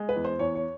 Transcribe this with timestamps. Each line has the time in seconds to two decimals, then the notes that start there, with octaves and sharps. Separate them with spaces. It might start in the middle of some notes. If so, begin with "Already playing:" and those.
Already playing: G#3
0.09 B4
0.16 E2
0.25 C5
0.39 E2 C#5
0.55 C#5